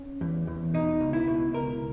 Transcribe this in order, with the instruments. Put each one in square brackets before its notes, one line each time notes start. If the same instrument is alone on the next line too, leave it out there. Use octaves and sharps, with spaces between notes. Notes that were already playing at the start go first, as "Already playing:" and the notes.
Already playing: [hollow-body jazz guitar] C#4
E2
E2
B2 D#4
C#2
E4
B2
C#2 A#4